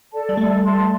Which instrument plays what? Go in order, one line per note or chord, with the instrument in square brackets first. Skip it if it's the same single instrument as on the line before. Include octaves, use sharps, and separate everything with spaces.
[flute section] A4 D5 A5
[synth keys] G3
[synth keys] A3 [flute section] A4
[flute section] E5 A5 C6